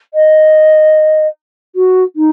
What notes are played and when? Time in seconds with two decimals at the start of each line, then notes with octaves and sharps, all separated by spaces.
0.14 D#5
1.75 F#4
2.16 D#4